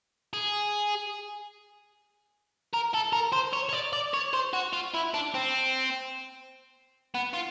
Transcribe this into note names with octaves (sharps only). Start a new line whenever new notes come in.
G#4
A#4
A4
A#4
C5
C#5
C#5
D5
D5
C#5
C5
F#4
F4
E4
D4
C4
B3
F4